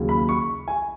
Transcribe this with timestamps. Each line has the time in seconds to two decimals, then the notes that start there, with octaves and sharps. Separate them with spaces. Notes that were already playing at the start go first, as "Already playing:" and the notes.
Already playing: D#2 C#3 F#3
0.09 B5
0.29 C#6
0.68 G#5